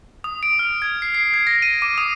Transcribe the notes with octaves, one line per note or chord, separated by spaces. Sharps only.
D#6
D7
F6
G#6
C7
C7
G#6
A#6
D#7
D6
D#6